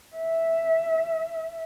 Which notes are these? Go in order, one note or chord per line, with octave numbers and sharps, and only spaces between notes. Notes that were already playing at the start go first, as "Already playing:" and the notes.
E5